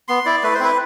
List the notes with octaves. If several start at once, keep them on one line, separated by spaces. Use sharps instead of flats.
B3 C6
E4 D5
A3 B4
C5
C4 E4 B4